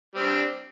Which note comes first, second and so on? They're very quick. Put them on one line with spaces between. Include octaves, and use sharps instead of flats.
G3 C4 D4